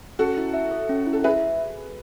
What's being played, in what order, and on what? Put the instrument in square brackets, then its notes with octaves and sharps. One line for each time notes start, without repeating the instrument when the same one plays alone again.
[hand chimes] C#4 [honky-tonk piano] F#4 A4
[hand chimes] E4
E5
A4
C#4
E4
[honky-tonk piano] A4
[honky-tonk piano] G#4 B4 [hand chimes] E5